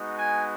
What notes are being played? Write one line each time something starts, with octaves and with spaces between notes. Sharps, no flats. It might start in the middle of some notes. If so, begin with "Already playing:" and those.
Already playing: G#3 B3 D#4 F#4
G#5